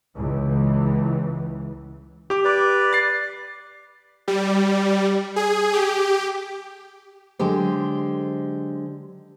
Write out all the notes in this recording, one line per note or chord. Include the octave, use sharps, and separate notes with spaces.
C#2 E3
G4 D6
B4 D5
A6 C7
G3
G#4
G4
D3 F#3 G#3 G4 C5